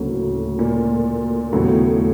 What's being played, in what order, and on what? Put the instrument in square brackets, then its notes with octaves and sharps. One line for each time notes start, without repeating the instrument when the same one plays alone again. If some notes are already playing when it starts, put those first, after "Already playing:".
Already playing: [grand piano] D2 C#3 F#3 A#3 C#4 [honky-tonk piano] A2
[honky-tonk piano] A#2
[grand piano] D#2 C#3 F#3 B3 [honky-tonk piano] A2